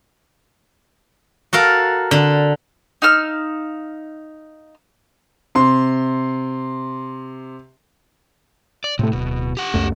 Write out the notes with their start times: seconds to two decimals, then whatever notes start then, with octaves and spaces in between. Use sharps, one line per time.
1.53 F#4 A4 A#4 F5
2.11 D3
3.02 D#4 F5 E6 F6
5.55 C3 C6
8.84 D5
8.99 A2 C3 A3
9.13 D1 B2
9.57 G4 F#5
9.74 C#2 F#2 A3